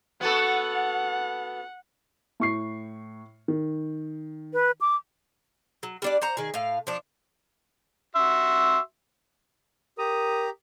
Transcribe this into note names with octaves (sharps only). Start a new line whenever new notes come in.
B3 F#4 A4 F#5
A2 C#6 C7
D#3
B4
D6
F#3
G3 D4 D5
C5 F#5 A#5
D#3 G#4
A2 F5
F3 D4
F#4 E5 C6
G4 A#4 A#5 D#6